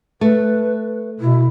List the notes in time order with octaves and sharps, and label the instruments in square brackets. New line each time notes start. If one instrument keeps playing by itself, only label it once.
[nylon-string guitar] A3 [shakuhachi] B4
[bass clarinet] B2 [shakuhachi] E4